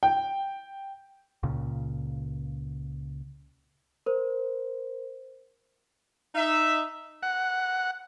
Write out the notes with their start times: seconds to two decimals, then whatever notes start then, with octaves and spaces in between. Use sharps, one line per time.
0.03 G5
1.43 C#2 A#2 C#3
4.06 A#4 C5
6.35 D#4 E5
7.23 F#5